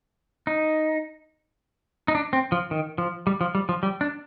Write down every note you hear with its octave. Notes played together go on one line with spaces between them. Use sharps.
D#4
D#4
D4
C4
F3
D#3
F3
G3
F3
G3
F3
G3
D4